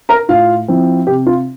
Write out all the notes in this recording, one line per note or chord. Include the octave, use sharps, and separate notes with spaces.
A#4 A#5
A2 F4 F5
F3 C4 E4
C3 G4
F4